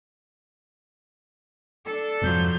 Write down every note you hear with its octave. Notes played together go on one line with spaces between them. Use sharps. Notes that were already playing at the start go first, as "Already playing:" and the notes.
D4 A4
F2 G#2 C3 F3 F#3 G6